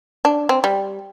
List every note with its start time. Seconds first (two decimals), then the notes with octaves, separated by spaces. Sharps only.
0.25 D4
0.49 C4
0.64 G3